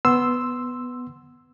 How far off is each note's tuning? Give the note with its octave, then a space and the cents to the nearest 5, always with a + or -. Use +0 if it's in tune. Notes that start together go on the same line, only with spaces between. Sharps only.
B3 +0 C6 +0 E6 +0